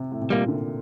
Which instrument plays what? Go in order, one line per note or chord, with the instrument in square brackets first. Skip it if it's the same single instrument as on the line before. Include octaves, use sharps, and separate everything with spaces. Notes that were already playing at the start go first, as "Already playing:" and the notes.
Already playing: [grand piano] C3
A2
C3
[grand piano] A#2 [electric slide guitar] G3 A#3
[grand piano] D3